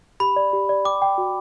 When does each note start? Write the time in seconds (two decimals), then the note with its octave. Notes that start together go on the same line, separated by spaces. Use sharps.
0.20 G4 B5
0.36 D5
0.53 G4
0.69 D5
0.85 G5 D6
1.02 G5
1.18 F#4